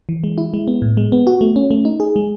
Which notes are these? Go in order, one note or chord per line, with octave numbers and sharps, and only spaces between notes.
E3
G#3
E4
G#3
B3
A2
G#3
B3
F#4
A3
C#4
A3
D#4
G#4
G#3